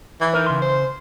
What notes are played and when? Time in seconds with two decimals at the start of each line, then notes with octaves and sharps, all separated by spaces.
0.20 E3
0.33 D#4 A#4
0.46 C#3 C6
0.62 C5